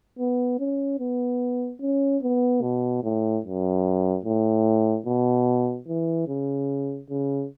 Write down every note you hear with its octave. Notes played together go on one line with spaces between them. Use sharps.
B3
C#4
B3
C#4
B3
B2
A2
F#2
A2
B2
E3
C#3
C#3